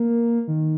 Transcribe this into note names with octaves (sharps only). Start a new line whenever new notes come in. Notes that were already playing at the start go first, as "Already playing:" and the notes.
Already playing: A#3
D#3